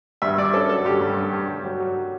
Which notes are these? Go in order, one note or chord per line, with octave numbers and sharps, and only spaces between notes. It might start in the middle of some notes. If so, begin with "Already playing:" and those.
G2 E5
G2 D5
C#4 A4
F#3 A4
G2 G4
G2
G2
G2
G2
F#3
F#3